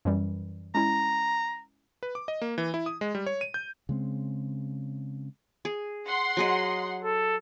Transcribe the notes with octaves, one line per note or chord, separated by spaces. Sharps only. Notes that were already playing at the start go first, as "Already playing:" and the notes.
F#2 E3 G3
G#3 C#4 E4 A#5
B4
D6
D#5
A#3
E3
E4
D#6
G#3
G3
C#5
D#7
G6
C#3 G#3 C4
G#4
F#5 C6
F#3 G#4 D#5
A4